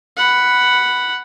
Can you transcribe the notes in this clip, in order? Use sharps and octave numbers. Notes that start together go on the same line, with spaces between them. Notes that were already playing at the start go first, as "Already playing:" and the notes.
F#5 B5